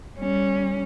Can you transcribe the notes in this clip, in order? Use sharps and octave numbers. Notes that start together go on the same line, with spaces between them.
G3 C#4